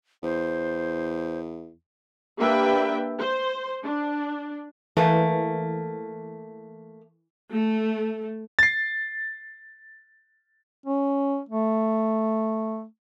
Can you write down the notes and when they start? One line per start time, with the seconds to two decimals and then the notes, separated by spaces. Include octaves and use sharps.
0.23 E2 C5
2.39 A#3 D4 G4 B4 E5 G5
3.19 C5
3.84 D4
4.97 E3 A3 A#3
7.51 A3
8.59 A6 C7
10.86 C#4
11.49 A3